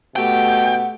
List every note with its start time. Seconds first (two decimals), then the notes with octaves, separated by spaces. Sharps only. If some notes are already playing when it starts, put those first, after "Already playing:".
0.16 B2 A3 G4 F#5 G5